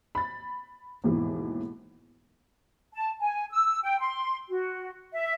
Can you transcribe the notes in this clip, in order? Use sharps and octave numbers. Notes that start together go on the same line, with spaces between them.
B5 A6
D#2 G#2 B2 E3
A5
G#5
E6
G5
C6
F#4
E5